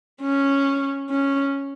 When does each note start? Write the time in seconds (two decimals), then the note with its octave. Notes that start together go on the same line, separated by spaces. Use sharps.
0.21 C#4
1.10 C#4